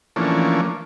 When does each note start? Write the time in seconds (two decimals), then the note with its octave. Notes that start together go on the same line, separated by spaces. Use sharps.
0.16 E3 F3 A3 A#3 C#4 D4